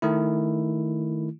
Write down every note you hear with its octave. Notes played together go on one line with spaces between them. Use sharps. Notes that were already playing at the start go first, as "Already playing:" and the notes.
D#3 A3 E4